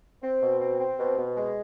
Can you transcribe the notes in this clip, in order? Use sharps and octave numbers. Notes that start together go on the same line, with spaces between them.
C4
B2
C4
C4
B2
B2
G#3